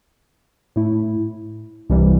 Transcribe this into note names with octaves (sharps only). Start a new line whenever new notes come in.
A2 A3 E4
C2 C3 E3 G3